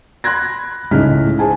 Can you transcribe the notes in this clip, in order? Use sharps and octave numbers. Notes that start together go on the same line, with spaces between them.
B5 C6 F#6 G#6 A#6
C#2 A2 G#3 D#4 F6 B6
G#4 C5 G#5 A5